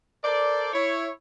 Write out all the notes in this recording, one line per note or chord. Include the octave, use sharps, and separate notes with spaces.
A4 A#4 C5 D5
E4 C#5